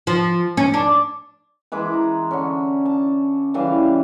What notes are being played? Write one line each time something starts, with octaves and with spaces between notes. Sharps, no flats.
F3
C#4
D4
E3 G#3 B5 D6
A#5
D3 C#4
A5
C#3 E3 G3 F5